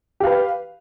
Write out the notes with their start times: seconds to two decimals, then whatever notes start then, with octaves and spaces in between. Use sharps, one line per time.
0.20 G4
0.24 F5
0.27 B4